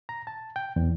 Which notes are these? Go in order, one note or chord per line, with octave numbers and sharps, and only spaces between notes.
A#5
A5
G5
E2